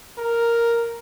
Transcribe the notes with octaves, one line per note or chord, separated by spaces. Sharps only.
A#4